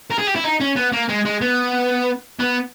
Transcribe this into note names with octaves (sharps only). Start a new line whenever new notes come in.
A#4
G#4
G4
E4
D#4
C#4
B3
A#3
G#3
G#3
B3
B3